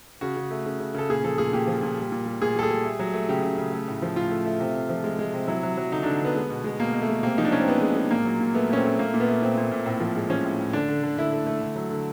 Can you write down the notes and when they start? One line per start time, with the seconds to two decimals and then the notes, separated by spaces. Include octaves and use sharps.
0.21 C#3 F#4
0.37 C#3
0.51 A3
0.66 C#3
0.80 C#3
0.95 C#3 A4
1.09 A#2 G#4
1.24 F3 A4
1.38 A#2 G#4
1.53 A#2 G4
1.67 F3
1.83 A#2
1.97 G3
2.12 A#2
2.26 G3
2.42 A#2 G#4
2.56 G3 A4
2.63 G#4
2.70 G3
2.85 A3
2.99 F#3
3.14 A3
3.29 C#3 G4
3.43 C#3
3.58 C#3
3.73 A3
3.88 A2
4.02 F3
4.16 A2 F4
4.31 A3
4.46 A3
4.60 C3
4.74 C3
4.90 F3
5.04 G#3
5.19 G#3
5.33 C3
5.47 F#3 E4
5.63 F#3
5.77 F#3
5.92 D3 D#4
6.03 D4
6.06 D3
6.21 D3 B3
6.35 G#3
6.51 B2
6.64 G#3
6.80 B2 A#3
6.93 B2
7.02 A3
7.09 G#3
7.23 C3 A#3
7.38 F3 D#4
7.45 D4
7.52 C3 C#4
7.60 C4
7.66 C3 B3
7.82 G#3
7.96 G#3
8.11 A#2 A#3
8.25 F#3
8.41 A#2
8.54 A3 B3
8.69 A#2 C#4
8.77 C4
8.83 A3
8.99 A#2 A#3
9.14 A#2
9.20 B3
9.28 A3
9.42 A#2 C4
9.57 A#2
9.72 A#2
9.86 A2 C4
10.00 F3
10.16 G#3
10.30 F3 C#4
10.45 A2
10.60 A2
10.73 D3 D4
10.88 D3
11.03 D3
11.17 D3 E4
11.33 A3
11.47 A3
11.61 D3
11.76 F#3
11.90 D3